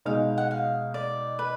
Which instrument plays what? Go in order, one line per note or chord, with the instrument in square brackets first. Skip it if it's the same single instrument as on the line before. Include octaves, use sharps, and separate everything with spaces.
[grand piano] B2 G#3 D#4 [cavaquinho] F5
[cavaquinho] F#5
F5
D5
B4